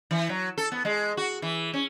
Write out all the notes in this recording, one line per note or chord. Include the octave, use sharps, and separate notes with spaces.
E3
F#3
A4
B3
G#3
F#4
E3
C#4